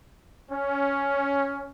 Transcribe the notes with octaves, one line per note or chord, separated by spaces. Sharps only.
C#4